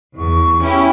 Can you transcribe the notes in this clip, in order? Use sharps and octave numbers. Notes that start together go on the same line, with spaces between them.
E2 C#6
C#4 E4 G4